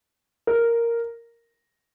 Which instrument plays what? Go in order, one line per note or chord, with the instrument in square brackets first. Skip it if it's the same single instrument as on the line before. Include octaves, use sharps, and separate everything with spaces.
[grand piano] A#4